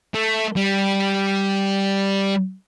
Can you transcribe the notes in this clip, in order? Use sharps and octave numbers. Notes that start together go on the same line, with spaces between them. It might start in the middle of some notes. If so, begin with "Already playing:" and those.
A3
G3